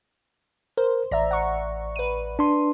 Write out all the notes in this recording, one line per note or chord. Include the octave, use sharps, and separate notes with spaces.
A#4 C5
A1 D5 E5 A#5
F#5 C#6
B4 D#7
D4 C6